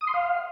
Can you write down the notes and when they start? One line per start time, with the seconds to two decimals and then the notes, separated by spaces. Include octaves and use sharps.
0.01 D#6
0.07 C6
0.14 F5